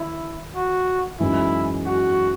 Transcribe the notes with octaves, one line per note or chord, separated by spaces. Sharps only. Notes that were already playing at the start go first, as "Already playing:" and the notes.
Already playing: D#3 E4
F#4
F#2 E3 G#3 D#4 E4
F#4